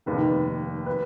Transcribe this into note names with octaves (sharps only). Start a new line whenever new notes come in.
F1 D#2 D#3 B4
B4